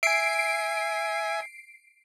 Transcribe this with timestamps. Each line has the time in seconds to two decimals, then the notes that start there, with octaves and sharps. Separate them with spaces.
0.03 E5 G#5 C7 D7